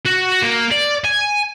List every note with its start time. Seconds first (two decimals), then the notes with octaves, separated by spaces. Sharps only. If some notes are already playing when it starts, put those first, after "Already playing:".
0.05 F#4
0.42 A#3
0.71 D5
1.04 G#5